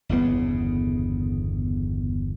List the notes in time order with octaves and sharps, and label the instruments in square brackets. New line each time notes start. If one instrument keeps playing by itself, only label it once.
[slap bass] G1 E2 C#3 B3